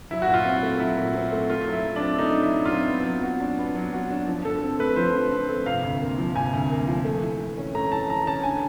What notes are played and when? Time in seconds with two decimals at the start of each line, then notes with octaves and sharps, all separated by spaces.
0.11 F#3 E4
0.22 F#4
0.27 A#2
0.34 F4
0.45 C4
0.57 E4
0.62 A3
0.79 F#3 E4
0.97 A#2
1.15 C4
1.32 A3
1.50 A3 F4
1.66 F#3
1.73 E4
1.84 F#3
1.96 C4 D4
2.19 A3 D#4
2.36 F#3
2.42 E4
2.54 F#3
2.65 C4 F4
2.88 B3
3.05 F#3
3.23 F#4
3.40 D4
3.57 B3
3.75 F#3
3.93 F#4
4.10 D4
4.28 F3
4.44 D3 A4
4.61 C4
4.79 A3 B4
4.96 F3 C5
5.15 D3
5.31 C4
5.49 A3
5.66 C3 F5
5.83 D2
6.01 A#3
6.18 F3
6.36 C3 G#5
6.53 D2
6.70 A#3
6.88 F3
7.05 A3
7.22 E3
7.40 E3
7.57 C#4
7.74 A3 A#5
7.91 E3 A5
8.09 E3 A#5
8.26 C#4 A5
8.44 D3 G#5